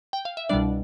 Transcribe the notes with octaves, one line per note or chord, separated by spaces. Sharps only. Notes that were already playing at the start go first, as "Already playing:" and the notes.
G5
F5
E5
C2 B2 G3 D4 D5